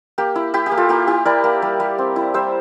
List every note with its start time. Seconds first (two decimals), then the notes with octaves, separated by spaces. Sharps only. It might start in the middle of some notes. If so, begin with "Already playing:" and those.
0.18 A#3 G4
0.35 E4
0.54 E4 G4
0.66 G4
0.72 A#3
0.77 F4 A4
0.89 A#3 G4
1.07 E4 G4
1.25 E4 A#4 D5
1.44 A#3
1.62 G3
1.80 G3
1.98 C4
2.16 E4
2.34 G3 C5 E5